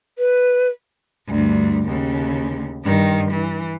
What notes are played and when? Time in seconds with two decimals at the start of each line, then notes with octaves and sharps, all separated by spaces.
0.19 B4
1.28 D2 G2
1.88 D#2 C#3
2.84 G2 D#3
3.31 E3